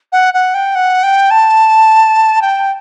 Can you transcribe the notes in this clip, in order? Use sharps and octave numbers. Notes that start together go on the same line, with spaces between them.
F#5
F#5
G5
F#5
G5
A5
G5